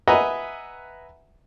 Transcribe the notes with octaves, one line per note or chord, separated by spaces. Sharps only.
B4 D#5 E5 F#5 G#5 A#5